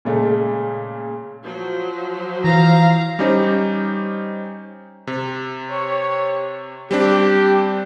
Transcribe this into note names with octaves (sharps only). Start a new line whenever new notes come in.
A#2 C#3 G#3 A3
F3 F#3 C5
E3 F5 A#5
G3 C#4 D#4 G4 C5
C3
G4 C#5
G3 C4 D4 G4